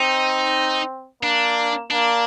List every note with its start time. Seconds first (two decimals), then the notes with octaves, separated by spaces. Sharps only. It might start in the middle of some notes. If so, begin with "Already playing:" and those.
Already playing: C4 D#4
1.23 A#3 D4
1.91 A#3 D4